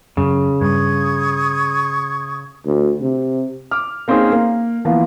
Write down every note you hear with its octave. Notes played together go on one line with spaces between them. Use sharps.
F#2 C#3
G2 C#6 D#6 G#6
D2
C3
D6 F6
A#3 C4 C#4 D#4 G#4
A#3
E3 F3 A#3 B3 F4